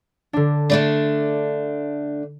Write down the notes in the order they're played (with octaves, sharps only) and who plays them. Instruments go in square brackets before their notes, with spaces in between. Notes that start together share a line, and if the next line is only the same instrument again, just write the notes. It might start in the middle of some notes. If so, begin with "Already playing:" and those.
[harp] D3 D4
[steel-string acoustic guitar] D3 A3 D4 [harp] C7